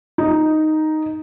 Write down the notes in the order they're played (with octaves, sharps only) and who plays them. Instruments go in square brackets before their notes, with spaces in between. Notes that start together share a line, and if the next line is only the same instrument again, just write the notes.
[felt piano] D#4